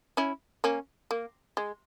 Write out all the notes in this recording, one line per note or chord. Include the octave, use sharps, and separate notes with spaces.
C#4 E4
A#3 C#4
A#3
G#3